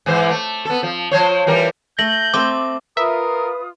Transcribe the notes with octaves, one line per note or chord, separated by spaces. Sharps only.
G#2 E3 C5
A3
B3 A4
F3
F3 C5 C#5
E3 G3 A#4
A3 G6 A#6 F#7
A3 C4 D6
F4 A#4 B4 E5 D#6